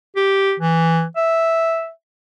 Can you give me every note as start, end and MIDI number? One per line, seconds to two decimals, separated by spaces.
0.16 0.54 67
0.60 1.04 52
1.16 1.89 76